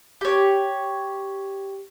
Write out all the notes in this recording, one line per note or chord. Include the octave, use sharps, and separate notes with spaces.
G4 C#5